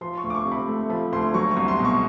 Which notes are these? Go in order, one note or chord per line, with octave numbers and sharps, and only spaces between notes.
F3 C6
C#6
D2
D6
C#6
C3
B5
A3
F3 B5
D2 C6
F#3 C#6
C#6
C2
C6
B2
C#6